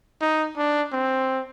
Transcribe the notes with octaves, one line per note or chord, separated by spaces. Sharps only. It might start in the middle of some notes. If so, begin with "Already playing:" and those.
D#4
D4
C4